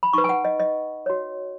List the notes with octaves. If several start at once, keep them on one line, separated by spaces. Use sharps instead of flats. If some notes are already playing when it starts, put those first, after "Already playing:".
B5
D#4 B4 C#6
G#5
F#5
D#5
D#5
F#4 C#5